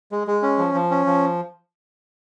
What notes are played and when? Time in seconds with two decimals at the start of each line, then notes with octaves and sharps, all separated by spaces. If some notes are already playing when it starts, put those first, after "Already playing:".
0.12 G#3
0.27 G#3
0.42 C#4
0.58 F3
0.74 F3
0.91 C#4
1.06 F3